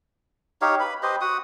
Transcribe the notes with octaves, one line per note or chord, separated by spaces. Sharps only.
D#4 G4 C#5 F5
B4 B5
G4 B4 C5 D#5
F#4 F#5 D#6